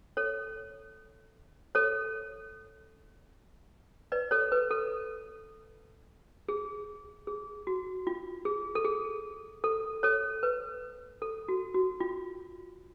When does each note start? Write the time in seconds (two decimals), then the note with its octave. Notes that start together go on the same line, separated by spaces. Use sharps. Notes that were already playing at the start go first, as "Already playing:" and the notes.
0.17 A4 C#5
1.75 A4 C#5
4.12 B4 D5
4.31 A4 C#5
4.52 B4
4.71 A4
6.49 G#4
7.27 G#4
7.67 F#4
8.07 F4
8.45 G#4
8.75 A4
8.84 G#4
9.64 A4
10.03 A4 C#5
10.43 B4
11.22 A4
11.48 F#4
11.75 F#4
12.00 F4